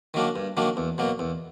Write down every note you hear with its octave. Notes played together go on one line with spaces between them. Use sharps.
D#3 F#3 A#3 D4
G2
D#3 F#3 A#3 D4
E2
B2 F#3 A#3
E2